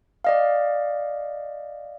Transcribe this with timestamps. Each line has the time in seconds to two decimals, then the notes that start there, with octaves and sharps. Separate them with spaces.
0.24 D5 D#5 F5